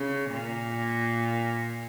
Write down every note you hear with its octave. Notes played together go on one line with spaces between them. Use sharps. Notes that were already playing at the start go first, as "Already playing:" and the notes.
Already playing: C#3
A#2